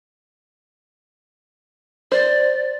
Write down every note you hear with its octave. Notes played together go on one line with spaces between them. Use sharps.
C5 D5